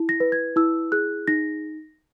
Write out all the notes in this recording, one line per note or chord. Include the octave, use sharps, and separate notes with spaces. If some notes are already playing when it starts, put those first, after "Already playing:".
Already playing: E4
A#6
B4
G#6
E4 E6
G#4 F#6
D#4 A#6